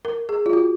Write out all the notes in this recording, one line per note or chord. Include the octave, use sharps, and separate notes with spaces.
A#4
G#4
F4
F#4